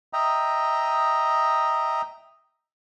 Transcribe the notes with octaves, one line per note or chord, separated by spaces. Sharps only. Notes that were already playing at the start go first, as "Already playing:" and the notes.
D#5 E5 G5 A#5 D#6